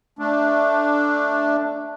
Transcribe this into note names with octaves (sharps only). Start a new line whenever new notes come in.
A3 D4